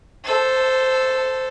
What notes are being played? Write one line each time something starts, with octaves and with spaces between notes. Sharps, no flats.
A4 C5